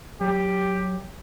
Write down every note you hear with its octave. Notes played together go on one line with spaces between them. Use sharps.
F#3 G4